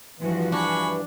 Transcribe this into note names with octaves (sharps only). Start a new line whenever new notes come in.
G2 E3 F3 F#4
D4 G#5 B5 C#6